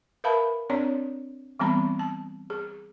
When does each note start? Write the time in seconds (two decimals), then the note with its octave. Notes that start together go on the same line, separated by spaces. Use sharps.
0.24 A#4 B4 E5 F5 A5 B5
0.70 C4 D4 C#5 D5 A#5
1.60 E3 G3 B3 C4 A#5 B5
1.99 A5
2.50 G#4